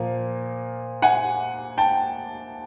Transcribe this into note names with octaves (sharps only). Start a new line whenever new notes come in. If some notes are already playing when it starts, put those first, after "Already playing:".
Already playing: A#2 F3 A#3
F#5 G#5
G5 A5